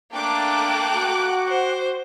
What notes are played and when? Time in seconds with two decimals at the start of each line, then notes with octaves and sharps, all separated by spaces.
0.14 A3 A#3 D4 G5 D6 F#6
0.94 F#4 F#5
1.48 C5